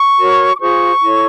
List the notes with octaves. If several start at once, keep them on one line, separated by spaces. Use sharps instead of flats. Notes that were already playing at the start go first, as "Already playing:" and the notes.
Already playing: C#6
F#4 A#4 C#5
D6
F4 G#4 C5 C#6
E4 A4 C#5